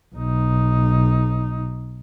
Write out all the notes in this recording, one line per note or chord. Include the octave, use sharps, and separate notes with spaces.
B1 D#4